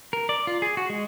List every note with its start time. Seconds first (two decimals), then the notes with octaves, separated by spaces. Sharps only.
0.13 A#4
0.29 D5
0.47 F4
0.62 G#4
0.77 F#4
0.90 G#3